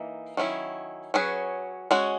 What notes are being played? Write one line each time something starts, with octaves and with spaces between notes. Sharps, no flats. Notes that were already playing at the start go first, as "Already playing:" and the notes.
Already playing: E3 A#3 D#4
D#3 F#3 C#4 E4
F#3 C#4 G#4 B4
G#3 C#4 F#4